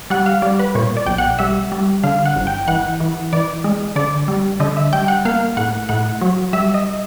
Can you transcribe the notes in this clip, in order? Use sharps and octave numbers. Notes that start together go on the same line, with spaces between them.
G3 F#5
F5
G3 D5
B4
A#2 C#5
D5
B1 G5
F#5
G3 E5
G3
D3 F5
F#5
G1
G5
E3 F#5
E3
E3 D5
G#3
D3 D5
G3
D3 D#5
E5
G3 G5
F#5
A#3 F5
A2 F#5
A2 F#5
F#3
G3 E5
D#5